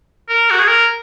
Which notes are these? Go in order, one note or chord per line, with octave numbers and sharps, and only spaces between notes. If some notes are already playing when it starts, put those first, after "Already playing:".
A#4
F#4
G#4
A#4